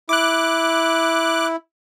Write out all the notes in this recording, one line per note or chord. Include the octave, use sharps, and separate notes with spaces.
E4 D6 F#6